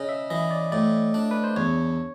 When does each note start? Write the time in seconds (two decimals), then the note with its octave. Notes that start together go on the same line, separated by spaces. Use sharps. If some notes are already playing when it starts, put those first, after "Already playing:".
Already playing: C#3 D#5
0.09 E5
0.30 E3 D#5
0.51 D5
0.72 A2 D5
1.14 D4
1.31 B4
1.44 C5
1.56 E2 C#5